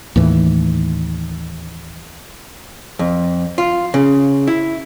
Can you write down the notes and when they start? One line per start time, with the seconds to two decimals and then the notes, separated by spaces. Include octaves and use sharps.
0.16 D#2 A2 E3
2.99 F2
3.58 F4
3.94 C#3
4.48 E4